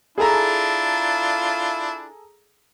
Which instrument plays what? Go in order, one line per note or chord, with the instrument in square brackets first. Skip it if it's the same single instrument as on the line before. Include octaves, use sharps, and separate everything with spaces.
[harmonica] D4 E4 F4 [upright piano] G#4 A4 A#5